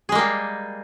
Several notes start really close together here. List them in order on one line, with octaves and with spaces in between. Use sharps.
G#4 G#3 A#3 G3